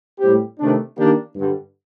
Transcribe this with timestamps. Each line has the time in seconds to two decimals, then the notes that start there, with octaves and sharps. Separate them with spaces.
0.19 A2 G3 C4 G4
0.58 C3 D#3 A3 D4
0.96 D#3 A#3 D4 G4
1.35 G2 D3 G3